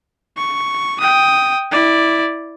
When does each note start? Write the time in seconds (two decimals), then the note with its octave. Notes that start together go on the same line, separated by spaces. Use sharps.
0.38 C#6
1.01 G5 D#6
1.72 E4 D5